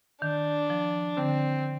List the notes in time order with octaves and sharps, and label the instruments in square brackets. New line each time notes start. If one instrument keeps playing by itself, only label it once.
[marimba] D#3 [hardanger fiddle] D4
[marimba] F3
[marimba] D3 [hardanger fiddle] C4